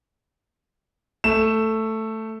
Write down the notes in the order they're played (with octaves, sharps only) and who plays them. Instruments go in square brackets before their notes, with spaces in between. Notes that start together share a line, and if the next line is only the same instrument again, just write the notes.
[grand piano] A3 E7